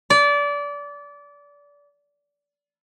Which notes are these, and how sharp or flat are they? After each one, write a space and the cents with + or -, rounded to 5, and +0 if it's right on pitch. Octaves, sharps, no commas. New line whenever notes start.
D5 -25